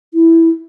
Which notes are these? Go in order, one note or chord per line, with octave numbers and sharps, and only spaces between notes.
E4